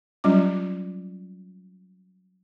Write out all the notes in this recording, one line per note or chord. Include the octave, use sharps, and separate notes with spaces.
F#3 G3 C#4 F4 D6